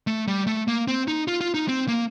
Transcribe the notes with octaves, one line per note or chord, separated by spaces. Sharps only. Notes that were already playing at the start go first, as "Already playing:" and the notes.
A3
G3
A3
A#3
C4
D#4
F4
F4
D#4
C4
A#3